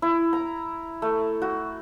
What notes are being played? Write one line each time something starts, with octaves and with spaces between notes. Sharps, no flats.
E4
A#5
A3
F#4